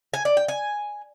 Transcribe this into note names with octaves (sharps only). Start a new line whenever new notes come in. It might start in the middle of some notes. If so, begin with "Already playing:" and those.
G#5
D5
G5
G#5